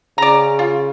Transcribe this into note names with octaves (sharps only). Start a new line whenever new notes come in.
C#3 D5 A#5
F4